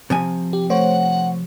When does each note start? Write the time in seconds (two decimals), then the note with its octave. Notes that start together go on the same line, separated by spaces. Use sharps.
0.10 C3 F3 G#5
0.53 G4
0.70 A3 C5 C#5 F#5